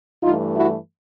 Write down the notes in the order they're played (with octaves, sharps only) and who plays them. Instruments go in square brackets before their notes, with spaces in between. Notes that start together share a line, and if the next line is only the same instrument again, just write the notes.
[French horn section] G2 E3 A3 D#4 F4
E4 F#4